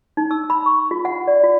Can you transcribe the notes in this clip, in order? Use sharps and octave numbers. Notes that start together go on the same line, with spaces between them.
D#4
E6
B5
C#6
F4
F#5
D5
F4